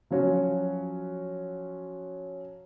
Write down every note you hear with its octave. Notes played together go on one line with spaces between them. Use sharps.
F3 F#3 C#4 F#4